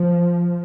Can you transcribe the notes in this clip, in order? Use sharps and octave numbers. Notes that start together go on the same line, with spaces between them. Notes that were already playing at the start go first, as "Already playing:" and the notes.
Already playing: F3